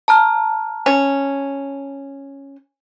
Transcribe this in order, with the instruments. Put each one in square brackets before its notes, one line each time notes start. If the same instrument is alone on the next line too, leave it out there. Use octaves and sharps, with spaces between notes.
[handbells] A5 A#5 F6
[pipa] C#4